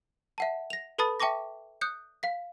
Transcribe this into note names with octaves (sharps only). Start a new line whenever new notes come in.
E5 F#5 A5
A#6 F7
A4 B4 A5 B5 D#6 A6
E5 G5 A5 C#6 D6 A#6
D#6 F#6 G6 C#7
F5 B6